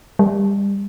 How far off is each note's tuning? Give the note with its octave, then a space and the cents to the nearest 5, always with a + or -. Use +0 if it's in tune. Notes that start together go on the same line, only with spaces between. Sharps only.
G3 +30